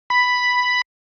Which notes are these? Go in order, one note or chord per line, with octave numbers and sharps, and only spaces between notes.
B5